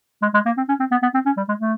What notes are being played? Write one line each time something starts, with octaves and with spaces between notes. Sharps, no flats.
G#3
G#3
A#3
C4
C#4
C4
B3
B3
C4
C#4
G3
G#3
A3